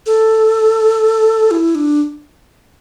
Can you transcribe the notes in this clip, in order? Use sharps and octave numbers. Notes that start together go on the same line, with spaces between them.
A4
E4
D4